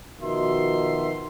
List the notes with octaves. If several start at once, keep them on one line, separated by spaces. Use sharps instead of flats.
B2 D#3 F3 F#4 E5 C6